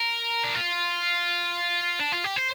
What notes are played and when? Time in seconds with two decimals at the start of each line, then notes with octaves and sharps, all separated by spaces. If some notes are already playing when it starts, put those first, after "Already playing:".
Already playing: A#4
0.44 D4
0.55 F4
2.00 D4
2.12 F4
2.24 G4
2.36 C5